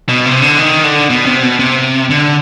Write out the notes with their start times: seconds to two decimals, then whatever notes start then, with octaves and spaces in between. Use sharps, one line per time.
0.09 B2
0.26 C3
0.42 D3
0.59 D#3
0.84 D3
1.10 B2
1.26 C3
1.43 B2
1.59 C3
2.10 D3